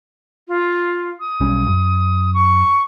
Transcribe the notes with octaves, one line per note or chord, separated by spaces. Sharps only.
F4
D#6
B1 G3 C#4
F#2
C#6